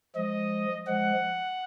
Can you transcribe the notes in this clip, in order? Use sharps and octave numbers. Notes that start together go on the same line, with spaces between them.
F3 G#3 D#5
F3 G#3 F#5